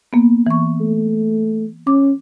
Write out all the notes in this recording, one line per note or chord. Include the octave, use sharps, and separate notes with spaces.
A#3 B3
E3 C#6
A3
C#4 D6